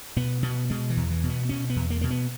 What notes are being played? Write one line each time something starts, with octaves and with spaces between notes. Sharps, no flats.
B2 B3
B2 B3
B2 G#3
E3
E2
E3
B2
B3
B2 C#4
B3
E2
A#3
B2 A#3
B3